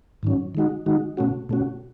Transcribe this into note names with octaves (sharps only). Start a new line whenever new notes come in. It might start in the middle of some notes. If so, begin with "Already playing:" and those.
G#2 D#3 F#3 C#4
D#3 G#3 D#4 F#4
D#3 G#3 D#4 F#4
B2 A3 C#4 F#4
B2 A3 C#4 F#4